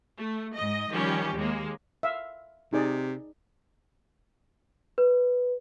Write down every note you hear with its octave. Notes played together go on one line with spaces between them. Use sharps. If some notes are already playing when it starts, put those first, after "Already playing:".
A3
G#2 D#5
D#3 F3 G3 C#4 G4
D#2 G#3 A#3
E5 F5
C3 D#4 G#4 D5
B4